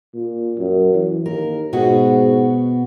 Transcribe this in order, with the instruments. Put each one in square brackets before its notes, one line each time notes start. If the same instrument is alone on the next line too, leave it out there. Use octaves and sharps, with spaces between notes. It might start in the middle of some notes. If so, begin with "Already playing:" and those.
[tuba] A#2
F#2
E3
[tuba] D#2 [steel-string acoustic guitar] A#4
[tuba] G#2 [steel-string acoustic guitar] B2 B3 F#4